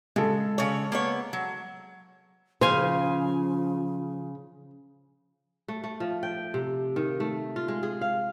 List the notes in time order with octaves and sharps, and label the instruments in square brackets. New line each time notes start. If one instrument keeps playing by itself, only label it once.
[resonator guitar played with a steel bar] C#3 [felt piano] G#3 A4
[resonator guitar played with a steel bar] C#3 C#5
A#3 B3 C#5
F#3
[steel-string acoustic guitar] C#3 [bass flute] F3 [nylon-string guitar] C5 [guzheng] F5 G#5
[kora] A3
A3
F3
G5
C3
D#3
A3
F4
G#3
G#4
F5